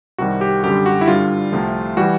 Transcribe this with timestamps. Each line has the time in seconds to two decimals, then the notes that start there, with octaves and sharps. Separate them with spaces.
0.18 C2 C3 D#3 G3 F#4
0.41 G4
0.64 F#2 D3 G3 G4
0.86 F#4
1.01 E4
1.08 G2 D3 G3 F4
1.52 C2 C3 F3 A3
1.97 E3 G3 F#4